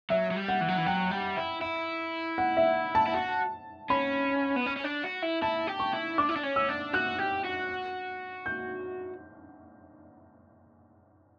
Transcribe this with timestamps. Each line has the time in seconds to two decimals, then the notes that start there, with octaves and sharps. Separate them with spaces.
0.10 F#3 E5
0.31 F#3
0.36 G3
0.48 F#5
0.61 E3
0.68 F#3
0.77 E3
0.86 F#3 G5
1.11 G3
1.37 E4
1.61 E4
2.38 F#5
2.57 E5
2.95 A5
3.06 E4
3.14 F#4
3.90 C#4 B5
4.56 B3
4.66 C#4
4.77 C#4
4.84 D4
5.04 F#4
5.23 E4
5.42 E4 A5
5.67 G4
5.79 C#6
5.93 E4
6.18 D4 D6
6.29 E4
6.36 D4
6.43 C#4
6.56 E6
6.68 D4
6.93 F#4 F#6
7.19 G4
7.44 F#4
8.46 G6